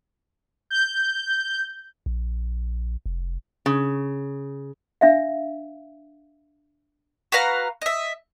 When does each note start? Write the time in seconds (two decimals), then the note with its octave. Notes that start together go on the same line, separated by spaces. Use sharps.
0.70 G6
2.06 A#1
3.06 F1
3.66 C#3
5.01 D4 E5 F5
7.32 F#4 B4 F5 A#5
7.81 D#5 E5